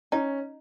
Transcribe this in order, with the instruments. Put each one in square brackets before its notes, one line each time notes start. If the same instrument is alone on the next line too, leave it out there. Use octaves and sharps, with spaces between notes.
[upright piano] C#4 [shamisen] D#4